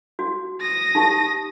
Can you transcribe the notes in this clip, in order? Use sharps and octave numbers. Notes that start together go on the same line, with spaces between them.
F#4
D#6 A#6
D#4 G4 A5